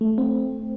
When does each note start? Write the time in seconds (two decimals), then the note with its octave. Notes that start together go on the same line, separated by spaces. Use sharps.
0.01 A3
0.18 C4